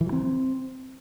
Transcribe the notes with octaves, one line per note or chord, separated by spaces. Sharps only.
E3
F#3
C4